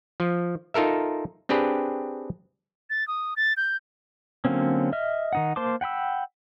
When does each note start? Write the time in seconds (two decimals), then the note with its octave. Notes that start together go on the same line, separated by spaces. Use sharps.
0.20 F3
0.74 D#4 F4 A4 A#4 E5
1.49 C4 D4 G4 G#4 B4
2.90 A6
3.08 D#6
3.37 A6
3.57 G6
4.45 D3 F#3 A#3 C4 C#4
4.93 D#5 E5 F6
5.33 D#3 D#4 F#5
5.56 A#3 C5 A5 C6 D6
5.81 F#5 G5 B5 E6